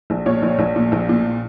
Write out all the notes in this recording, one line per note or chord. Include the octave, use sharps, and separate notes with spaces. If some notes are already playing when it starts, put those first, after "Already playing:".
A#1
A#2 C#5
A#1
A#1
A#2
A#1
A#2